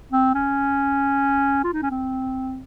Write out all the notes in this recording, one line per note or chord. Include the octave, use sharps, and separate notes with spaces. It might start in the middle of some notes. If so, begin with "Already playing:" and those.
C4
C#4
F4
D#4
C#4
C4